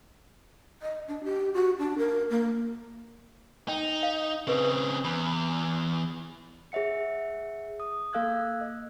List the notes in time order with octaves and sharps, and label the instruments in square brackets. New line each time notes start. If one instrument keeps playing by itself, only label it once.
[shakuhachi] D#5
D4
G4
F#4
D4
A#4
A#3
[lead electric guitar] D#4 [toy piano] G5
[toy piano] F5
[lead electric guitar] C#3 C4 [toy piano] G#4 B4
[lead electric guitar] E2 [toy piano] B5
[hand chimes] G#4 C#5 E5 F#5 C#7
D#6
A#3 A4 F5 E6 F#6 G#6
D#5